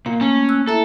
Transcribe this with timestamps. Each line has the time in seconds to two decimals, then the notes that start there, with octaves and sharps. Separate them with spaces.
0.06 A#2 A#3
0.21 A3 A#3 C#4
0.49 E6 F#6
0.67 E4 A4 E5 A#5